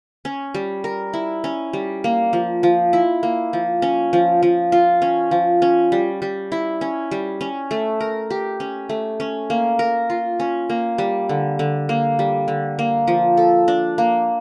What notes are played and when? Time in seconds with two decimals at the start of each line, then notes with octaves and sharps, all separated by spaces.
0.25 C#4
0.54 G3
0.84 A#4
1.13 E4
1.44 C#4
1.73 G3
2.04 A#3
2.33 F3
2.63 F3
2.93 E4
3.23 A#3
3.53 F3
3.82 C#4
4.13 F3
4.43 F3
4.72 F4
5.02 C#4
5.31 F3
5.62 C#4
5.92 G3
6.22 G3
6.52 E4
6.81 C#4
7.11 G3
7.41 C#4
7.71 A3
8.01 A#4
8.30 G4
8.60 C#4
8.89 A3
9.20 C#4
9.50 A#3
9.79 A#4
10.10 F4
10.40 C#4
10.70 A#3
10.98 G3
11.29 D3
11.59 D3
11.89 A#3
12.19 G3
12.48 D3
12.79 A#3
13.08 F3
13.37 A4
13.68 D4
13.98 A#3